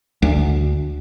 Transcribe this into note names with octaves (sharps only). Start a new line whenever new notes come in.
D2